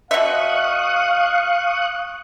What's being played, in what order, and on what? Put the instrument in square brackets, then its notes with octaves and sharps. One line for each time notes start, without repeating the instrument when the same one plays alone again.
[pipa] B2 E5 [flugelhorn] F5 [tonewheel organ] C#6 D#6 F#6